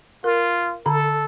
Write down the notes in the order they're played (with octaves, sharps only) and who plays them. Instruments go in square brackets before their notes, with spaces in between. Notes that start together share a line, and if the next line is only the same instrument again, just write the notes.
[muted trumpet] F4 [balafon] A#4
[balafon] D3 B5 [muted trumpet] A4